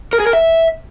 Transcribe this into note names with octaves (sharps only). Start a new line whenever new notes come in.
A#4
G#4
A#4
E5